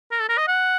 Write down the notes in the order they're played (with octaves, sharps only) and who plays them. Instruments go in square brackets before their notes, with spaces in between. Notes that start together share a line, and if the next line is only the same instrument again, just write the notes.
[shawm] A#4
A4
A#4
D#5
F#5